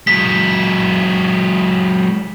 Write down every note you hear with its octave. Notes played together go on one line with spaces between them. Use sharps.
F#3 G#3 B6